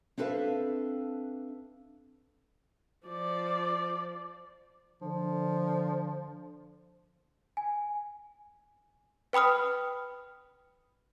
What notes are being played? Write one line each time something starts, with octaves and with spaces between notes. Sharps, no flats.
C4 D4 A4 B4 E5 F5
F3 D5
D3 F3
G#5
B4 G5 B5 D#6 F6